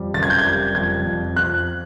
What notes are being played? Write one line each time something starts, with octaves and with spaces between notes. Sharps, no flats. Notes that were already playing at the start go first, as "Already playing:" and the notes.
Already playing: F2 G3
F#1 A6
G#6
G6
G#6
G3
F2 G#6
F2
F2 F#6